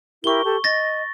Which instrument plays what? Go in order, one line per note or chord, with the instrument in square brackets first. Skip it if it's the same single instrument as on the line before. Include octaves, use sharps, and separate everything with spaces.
[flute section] E4 G4 A#4 [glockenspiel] C#6 G7
[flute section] G4 A4 A5
[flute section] D#5 [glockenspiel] A6 A#6